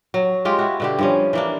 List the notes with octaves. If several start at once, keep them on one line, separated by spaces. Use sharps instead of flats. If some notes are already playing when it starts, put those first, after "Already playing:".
F#3
G#3 F4 G4
E4 F#4
B2 D3 G4
G2 F3 C#4
E3 A#3 D4